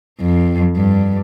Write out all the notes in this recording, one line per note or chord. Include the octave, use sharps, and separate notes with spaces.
F2
G2